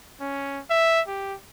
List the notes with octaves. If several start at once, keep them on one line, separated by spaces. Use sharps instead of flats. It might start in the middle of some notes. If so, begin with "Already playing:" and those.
C#4
E5
G4